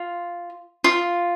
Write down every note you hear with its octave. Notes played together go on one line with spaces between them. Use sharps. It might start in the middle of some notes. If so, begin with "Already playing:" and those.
Already playing: F4
F4